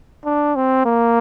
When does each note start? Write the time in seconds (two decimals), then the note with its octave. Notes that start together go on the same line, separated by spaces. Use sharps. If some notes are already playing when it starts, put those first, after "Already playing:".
0.25 D4
0.55 C4
0.86 A#3